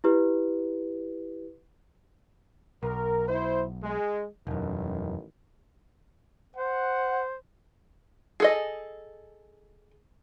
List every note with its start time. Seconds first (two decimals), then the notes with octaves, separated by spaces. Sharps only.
0.04 E4 G4 B4
2.83 B1 A#4
3.27 E4 C5
3.82 G#3
4.47 E1 A1 F#2 D#3
6.56 C5 F#5
8.40 G#4 A4 D#5